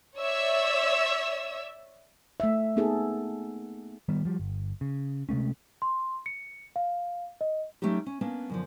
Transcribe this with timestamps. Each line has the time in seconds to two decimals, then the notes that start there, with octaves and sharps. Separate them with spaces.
0.16 C#5 D5 E5 E6
2.40 A3 E5
2.76 A#3 B3 D#4 G#4 A4
4.08 D#3 G3 B3
4.25 F3 G3
4.40 G1
4.81 C#3
5.29 C3 G#3 A3 C#4
5.82 C6
6.26 C#7
6.76 F5
7.41 D#5
7.82 F#3 A3 C#4 D#4 G4
8.06 C#4
8.21 A#3 B3 C#4 D4
8.50 F#2 D3 F3